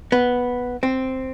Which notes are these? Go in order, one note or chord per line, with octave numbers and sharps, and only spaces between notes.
B3
C4